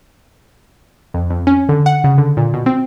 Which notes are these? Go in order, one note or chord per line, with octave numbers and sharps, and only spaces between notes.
F2
F2
C#4
D3
F#5
C#3
D3
A#2
B2
C4